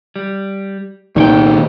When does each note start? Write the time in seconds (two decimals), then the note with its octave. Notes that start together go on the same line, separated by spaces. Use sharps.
0.16 G3
1.16 C2 A#2 D#3 C#5 G5